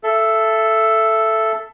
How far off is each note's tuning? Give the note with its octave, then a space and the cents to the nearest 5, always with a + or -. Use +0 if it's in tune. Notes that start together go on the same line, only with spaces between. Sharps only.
A4 +0 E5 +20